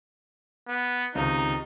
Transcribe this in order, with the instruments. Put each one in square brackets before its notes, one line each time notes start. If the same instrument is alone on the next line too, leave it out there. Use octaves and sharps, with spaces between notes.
[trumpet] B3
[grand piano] C#2 C3 D#3 [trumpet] D#4